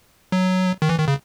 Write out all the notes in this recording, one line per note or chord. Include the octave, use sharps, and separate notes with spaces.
F#3
D#3
E3
D#3
C#3